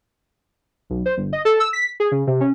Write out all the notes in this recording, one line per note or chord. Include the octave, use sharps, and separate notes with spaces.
B1
C5
G1
D#5
A4
E6
B6
G#4
C#3
C3
C#4